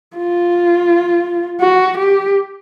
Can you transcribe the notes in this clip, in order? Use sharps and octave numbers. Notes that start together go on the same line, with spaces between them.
F4
F#4
G4